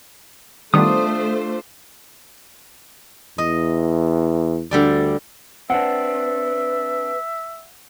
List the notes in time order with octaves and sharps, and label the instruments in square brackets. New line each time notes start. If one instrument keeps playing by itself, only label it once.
[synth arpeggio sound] D#3 G3 B3 [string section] A3 C5 [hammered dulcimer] D4 F4 [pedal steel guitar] D#6
[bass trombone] E2 [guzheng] D#5
[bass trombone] D2 [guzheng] D3 G3 D5
[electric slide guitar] C4 D4 [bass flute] B4 [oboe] E5 [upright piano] F#5